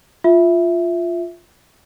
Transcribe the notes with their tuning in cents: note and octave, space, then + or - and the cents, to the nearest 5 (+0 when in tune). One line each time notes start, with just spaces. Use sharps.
F4 +0 E5 +0